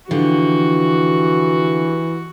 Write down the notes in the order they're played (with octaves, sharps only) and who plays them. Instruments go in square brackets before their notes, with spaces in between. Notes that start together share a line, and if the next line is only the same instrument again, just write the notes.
[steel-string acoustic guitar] D3 F3 G4 [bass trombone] E3 [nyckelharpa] F#4